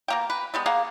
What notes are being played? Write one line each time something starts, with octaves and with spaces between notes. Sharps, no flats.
B2 A#3 G5
B4
G3 G#3 B3
A#3 G#4 F5 F#5